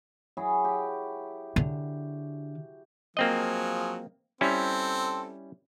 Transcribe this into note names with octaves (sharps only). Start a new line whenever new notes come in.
F#3 E4 G#4
G4
D3
F3 F#3 A#3 C4 G#4 D#5
G3 C4 C#4 E4 A4